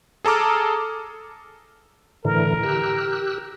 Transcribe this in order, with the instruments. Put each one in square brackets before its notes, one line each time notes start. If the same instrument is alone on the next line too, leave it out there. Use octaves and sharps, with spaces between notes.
[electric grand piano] G#4 A4 A#5 D6 F6
[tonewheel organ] A2 D3 E3 [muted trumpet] A#4
[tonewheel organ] G4 E6 F#6